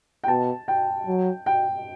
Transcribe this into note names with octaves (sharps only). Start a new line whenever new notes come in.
G5
B2 A5
G5
F#3
G5